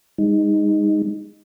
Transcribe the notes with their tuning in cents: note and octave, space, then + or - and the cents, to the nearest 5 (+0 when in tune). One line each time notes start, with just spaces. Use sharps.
G#3 -30 D#4 +0